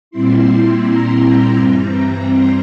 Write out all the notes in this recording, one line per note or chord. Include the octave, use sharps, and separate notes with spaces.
A#2 G3 C4 E4 C6
A#5
G5
G2 E3 G3 C4 A#5
C6